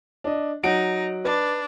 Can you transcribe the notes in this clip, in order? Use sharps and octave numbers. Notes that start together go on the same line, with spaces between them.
D4 D#5
F#3 D#4 F#5 D7
D4 B4